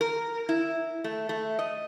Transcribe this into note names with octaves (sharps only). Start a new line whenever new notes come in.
A#4
E4
A3
A3
D#5